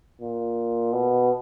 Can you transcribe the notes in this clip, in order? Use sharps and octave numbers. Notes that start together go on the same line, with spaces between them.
A#2
B2